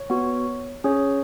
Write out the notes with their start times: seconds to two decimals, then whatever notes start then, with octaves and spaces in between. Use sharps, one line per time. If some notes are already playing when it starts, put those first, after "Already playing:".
Already playing: C#5
0.10 B3 F#4
0.84 C#4 G#4 C#5